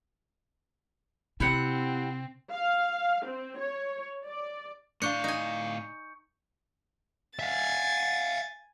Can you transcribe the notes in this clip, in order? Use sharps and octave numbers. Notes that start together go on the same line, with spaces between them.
C3 C4 E4 G4 F#5
F5
C4
C#5
D5
A2 D4 F5 C#6 G6 C#7
D#4 G#5
E5 F5 G#5 A6